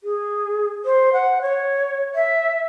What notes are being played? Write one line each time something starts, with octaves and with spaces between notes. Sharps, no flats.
G#4
C5
F#5
C#5
E5